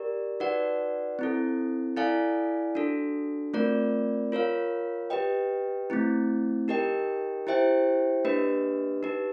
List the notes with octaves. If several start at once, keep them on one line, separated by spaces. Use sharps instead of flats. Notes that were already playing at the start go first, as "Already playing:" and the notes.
Already playing: G4 A#4 D5
D#4 F#4 B4 D5 F#5
C4 E4 A4
E4 A4 D5 F5 G#5
D4 F#4 A4
A3 C4 F4 A#4 D5
F4 A#4 C#5 F5
G4 B4 D#5 G5
A3 C4 E4
D#4 G4 A#4 D#5 G5
E4 G4 C5 E5 G5
A#3 D4 G4 B4 D#5
D#4 G4 B4